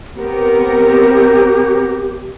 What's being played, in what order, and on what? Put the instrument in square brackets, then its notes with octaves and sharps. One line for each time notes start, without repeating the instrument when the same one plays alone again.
[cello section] B3 C4 A#4 [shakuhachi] G4